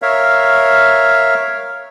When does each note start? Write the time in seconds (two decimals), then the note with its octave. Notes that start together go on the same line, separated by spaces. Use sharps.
0.02 A#4 C#5 E5 F5